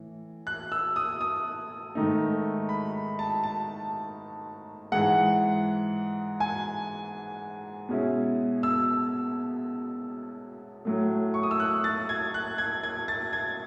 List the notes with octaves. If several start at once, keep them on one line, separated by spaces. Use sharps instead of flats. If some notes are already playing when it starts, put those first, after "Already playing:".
Already playing: A2 E3
F#6
E6
D#6
D#6
G#2 D#3 A3 D#4
B5
A5
A5
G#2 E3 G#3 F#5
G#5
B2 G#3 C#4 E4
E6
A2 F#3 A3
C#6
D#6
E6
F#6
A6
G#6
F#6
G#6
G#6
A6
G#6